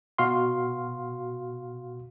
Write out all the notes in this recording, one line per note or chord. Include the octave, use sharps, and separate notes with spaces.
B2 F#4 F5 C6